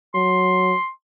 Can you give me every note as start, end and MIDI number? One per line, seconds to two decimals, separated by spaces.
0.14 0.74 54
0.14 0.90 84